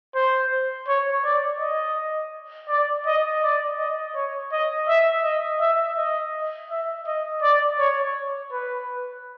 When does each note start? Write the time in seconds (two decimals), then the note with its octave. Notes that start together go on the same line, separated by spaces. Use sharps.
0.15 C5
0.88 C#5
1.24 D5
1.60 D#5
2.69 D5
3.06 D#5
3.43 D5
3.78 D#5
4.15 C#5
4.52 D#5
4.89 E5
5.24 D#5
5.61 E5
5.97 D#5
6.71 E5
7.07 D#5
7.42 D5
7.79 C#5
8.52 B4